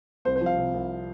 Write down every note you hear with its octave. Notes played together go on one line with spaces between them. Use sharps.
C2 C5
C5
F3
F5
C3
C2